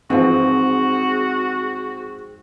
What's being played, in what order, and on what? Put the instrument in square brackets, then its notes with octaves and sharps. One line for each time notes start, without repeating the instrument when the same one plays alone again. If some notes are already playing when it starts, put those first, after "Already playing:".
[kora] G#2 E3 F3 [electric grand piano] C4 [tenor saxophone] F#4 [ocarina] G#4